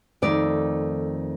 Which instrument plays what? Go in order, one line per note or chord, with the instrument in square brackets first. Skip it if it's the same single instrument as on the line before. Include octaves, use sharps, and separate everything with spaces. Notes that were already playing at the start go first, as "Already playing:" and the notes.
[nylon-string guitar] F2 D#3 A3 D5